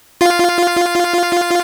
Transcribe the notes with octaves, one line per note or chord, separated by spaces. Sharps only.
F4 F5